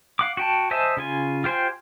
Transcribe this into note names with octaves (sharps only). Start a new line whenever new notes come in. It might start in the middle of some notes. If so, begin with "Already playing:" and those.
F5 F#5 D6
F#4 G5 A5
C5 D#5 E5 G#5 A5
C#3 F4 G#5
F4 G4 C5 G5 G#5